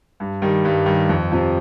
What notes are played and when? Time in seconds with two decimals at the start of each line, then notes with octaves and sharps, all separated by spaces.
0.20 G2
0.42 D#3 G3
0.65 G2
0.86 D#3 G3
1.09 F2
1.31 C3 F3